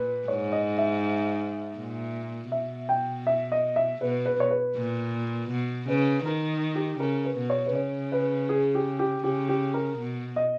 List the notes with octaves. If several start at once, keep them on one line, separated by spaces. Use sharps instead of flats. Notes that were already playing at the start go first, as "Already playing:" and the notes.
Already playing: A#2 B4
G#2 C#5
D#5
E5
A#2
B2 E5
G5
E5
D#5
E5
B2 B4
B4
C#5
B4
A#2
B2
C#3 B4
D#3 A#4
G4
C#3 A#4
B4
B2
C#5
B4
C#3 C#5
B4
G#4
G4
G4
C#3 G4
G4
A#4
B2
D#5